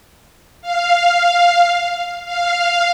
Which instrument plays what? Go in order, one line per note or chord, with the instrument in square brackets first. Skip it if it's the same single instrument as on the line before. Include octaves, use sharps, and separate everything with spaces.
[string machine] F5
F5